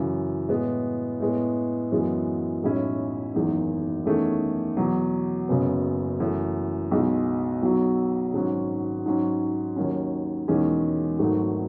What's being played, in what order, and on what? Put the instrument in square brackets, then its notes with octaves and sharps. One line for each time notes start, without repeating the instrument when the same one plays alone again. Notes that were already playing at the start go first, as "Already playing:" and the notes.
Already playing: [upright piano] F#2 C#3 E3
A2 G#3 B3
A2 G#3 B3
F#2 E3 G#3 B3
B1 A2 G#3 C#4 E4
F#1 E2 D#3 G#3 D#4
E2 D#3 A3 C#4 G#4
E2 B2 F#3
F#1 F#2 C#3 G#3 B3
F#2 E3 A3
B1 B2 G#3
B1 B2 F#3
G#1 G#2 F#3 C#4
G#2 F#3 C#4
D#2 D#3 F#3 C#4
E1 E2 D#3 G#3 C#4
G#1 G#2 D#3 F#3 A3